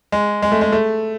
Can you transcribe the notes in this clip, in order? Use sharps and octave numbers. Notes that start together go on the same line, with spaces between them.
G#3
G#3
A3
G#3
A3